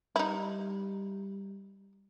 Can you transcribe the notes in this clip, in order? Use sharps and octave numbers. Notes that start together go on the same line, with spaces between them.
G3 D#4 E4